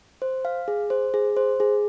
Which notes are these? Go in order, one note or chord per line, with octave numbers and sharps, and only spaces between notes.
C5
F5
G#4
C5
G#4
C5
G#4